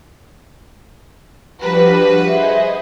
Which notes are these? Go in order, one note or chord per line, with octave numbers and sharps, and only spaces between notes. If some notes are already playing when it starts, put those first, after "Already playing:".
F3 G3 D4 F#4 G4 B4
G#4 C5 D#5 E5